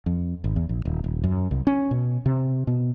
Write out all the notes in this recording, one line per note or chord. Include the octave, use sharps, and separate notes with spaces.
F2
G#1
E2
A#1
D#1
D#1
F#2
C2
C#4
B2
C3
B2